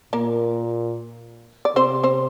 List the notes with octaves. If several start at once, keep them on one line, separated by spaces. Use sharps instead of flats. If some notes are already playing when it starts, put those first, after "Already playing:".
A#2 A#3 A#4
D5
C3 C4 C5
C4 C5